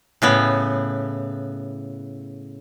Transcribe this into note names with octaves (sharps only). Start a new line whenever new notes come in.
A2 C#3 B3